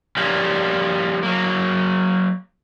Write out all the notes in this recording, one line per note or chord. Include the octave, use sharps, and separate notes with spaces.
F3 G3 A#3 C#4
F#3 A#3